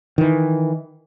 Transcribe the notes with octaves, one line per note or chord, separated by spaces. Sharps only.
D#3 E3